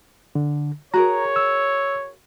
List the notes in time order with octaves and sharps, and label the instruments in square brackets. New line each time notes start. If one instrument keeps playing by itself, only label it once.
[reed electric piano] D3
[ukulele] F#4 G#4 A#4 [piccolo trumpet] C#5 [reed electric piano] A#5
[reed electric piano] E6